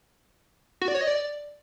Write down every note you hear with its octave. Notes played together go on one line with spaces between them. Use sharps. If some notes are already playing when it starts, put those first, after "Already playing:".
F#4
D5
C#5
D#5
D5